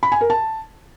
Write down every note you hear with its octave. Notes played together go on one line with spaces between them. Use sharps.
B5
G#5
A#4
A5